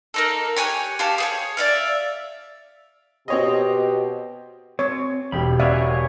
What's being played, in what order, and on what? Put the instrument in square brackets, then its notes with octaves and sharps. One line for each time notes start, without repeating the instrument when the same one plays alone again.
[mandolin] A#3 D#4 A4
G4 C#5 G#5 F#6
G4 F5 A5
G#4 C5 C#5
D5 E5 F5
[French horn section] B2 G4 [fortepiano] C4 C#5 D#5
[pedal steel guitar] C4 [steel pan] C#5
[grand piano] E1 G4 [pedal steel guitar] B5
[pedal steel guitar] C#3 B3 C#5 [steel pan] D5 E5 F5
[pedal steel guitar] A#4 C#5 G#5